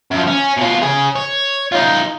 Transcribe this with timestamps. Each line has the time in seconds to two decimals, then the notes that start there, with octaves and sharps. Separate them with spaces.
0.11 F#2 F3
0.27 C#4
0.57 B2 F4
0.82 G#4 C#5
1.16 C#5
1.72 D#4 F4